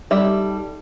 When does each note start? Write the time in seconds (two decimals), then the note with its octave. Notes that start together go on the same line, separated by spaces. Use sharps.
0.11 G3 D#4 G4 A4 E5